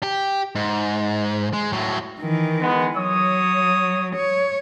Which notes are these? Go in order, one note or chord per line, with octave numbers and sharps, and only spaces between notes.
G4
G#2
G#3
A2 F#3
D#3 E3
G#3 B3
F#3 C#5 D#6
C#5